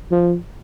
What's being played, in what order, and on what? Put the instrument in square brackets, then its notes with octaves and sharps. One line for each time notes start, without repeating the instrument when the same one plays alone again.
[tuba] F3